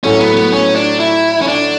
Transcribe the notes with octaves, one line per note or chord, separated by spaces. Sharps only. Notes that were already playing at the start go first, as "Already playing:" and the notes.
A2 F#3 A3 C#4
B3
B3
C#4
D4
E4
C#4
D4